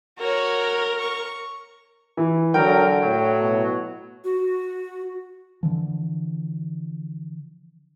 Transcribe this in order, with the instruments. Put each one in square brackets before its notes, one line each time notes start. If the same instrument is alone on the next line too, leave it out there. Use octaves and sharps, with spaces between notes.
[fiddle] F#4 C#5 [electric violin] A#4
[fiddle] C#6
[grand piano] E3
[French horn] D3 [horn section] F#3 A#4 [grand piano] G5
[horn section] A2 F#3
[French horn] B2
[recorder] F#4
[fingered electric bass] D3 E3 F3